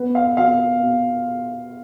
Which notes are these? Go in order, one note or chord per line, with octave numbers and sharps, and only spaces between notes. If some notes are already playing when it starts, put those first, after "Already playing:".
Already playing: B3
F5
B2 F5
B2